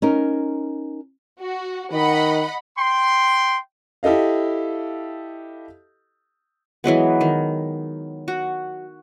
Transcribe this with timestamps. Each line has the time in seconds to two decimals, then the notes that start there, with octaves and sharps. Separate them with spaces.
0.02 C#4 D#4 A#4
1.41 F#4
1.92 D#3 D#5 F#5 B5
2.78 G5 C6
4.03 E4 G4 A4 D#5 F5
6.84 E3 F#3 G#3 B3
7.21 D#3
8.28 F#4